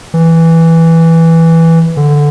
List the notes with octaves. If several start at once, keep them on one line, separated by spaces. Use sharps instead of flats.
E3
D3